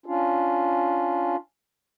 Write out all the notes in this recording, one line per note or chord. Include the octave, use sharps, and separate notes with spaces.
C#4 D4 F4